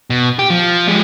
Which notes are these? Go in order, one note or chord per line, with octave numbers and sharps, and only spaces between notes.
B2
G4
F3
G3 G#3